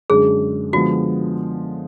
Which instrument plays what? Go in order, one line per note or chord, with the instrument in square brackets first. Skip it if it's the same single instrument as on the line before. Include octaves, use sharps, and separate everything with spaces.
[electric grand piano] F#2 D3 G#3 D4 [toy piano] G#4
[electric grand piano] D3 F3 G#3 B3 [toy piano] F#4